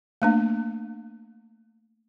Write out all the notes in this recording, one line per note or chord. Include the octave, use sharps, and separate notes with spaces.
A3 A#3 D4